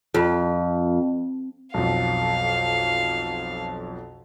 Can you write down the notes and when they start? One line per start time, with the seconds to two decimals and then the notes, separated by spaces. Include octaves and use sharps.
0.14 F2
1.74 B1 F2 F5